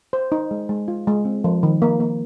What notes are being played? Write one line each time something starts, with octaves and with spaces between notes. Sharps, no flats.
C5
D#4
G#3
G#3
F4
G#3
C4
F3
D#3
A#3
A#3